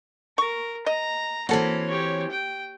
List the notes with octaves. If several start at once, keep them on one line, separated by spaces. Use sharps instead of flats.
A#4 C#6
D#5 A#5
E3 A#3 C4 C#4 F#4 A4
G4 C#5
G5